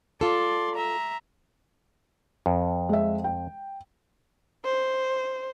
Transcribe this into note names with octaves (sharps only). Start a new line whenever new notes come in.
F4 A4 D5 C6
E5 A#5
F2
G#3 E5
G5
C5